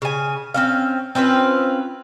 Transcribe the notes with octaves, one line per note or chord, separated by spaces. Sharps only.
C#3 G#5
C4 C#4 F5
C4 C#4 F4 B4